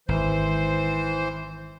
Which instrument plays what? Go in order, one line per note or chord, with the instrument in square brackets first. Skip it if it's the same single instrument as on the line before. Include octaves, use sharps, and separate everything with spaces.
[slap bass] G#1 [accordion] E3 C5